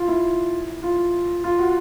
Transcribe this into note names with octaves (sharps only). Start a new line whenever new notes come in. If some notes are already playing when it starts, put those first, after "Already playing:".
Already playing: F4
E4
F4
F4
F#4